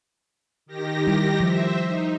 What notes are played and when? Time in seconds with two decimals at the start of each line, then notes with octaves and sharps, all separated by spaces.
0.66 D#3 G4 A#6
1.07 G3 E4
1.40 F3 C5 E5
1.84 D#4